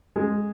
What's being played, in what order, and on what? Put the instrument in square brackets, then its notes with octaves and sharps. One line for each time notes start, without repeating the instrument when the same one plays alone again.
[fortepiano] G#3